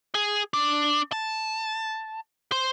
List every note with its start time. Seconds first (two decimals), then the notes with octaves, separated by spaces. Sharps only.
0.15 G#4
0.54 D4
1.12 A5
2.52 C5